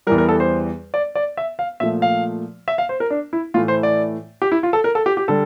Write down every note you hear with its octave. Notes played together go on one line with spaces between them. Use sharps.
E2 E3 G3 A#4
A#4
A4
C5
D5
D5
E5
F5
A#2 F3 A3 E5
F5
E5
F5
C5
A#4
D4
E4
A2 E3 A3 F4
C5
D5
G4
E4
F4
A4
A#4
A4
G4
G4
D3 G3 A4